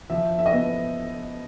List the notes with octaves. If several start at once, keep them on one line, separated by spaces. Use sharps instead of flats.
F3 E5
E5
D#5
B3 E5